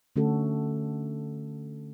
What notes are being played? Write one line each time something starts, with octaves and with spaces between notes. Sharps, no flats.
D3 A3 C#4 F#4 A4